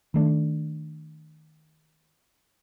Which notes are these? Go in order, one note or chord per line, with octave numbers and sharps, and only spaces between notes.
D#3 A3 D4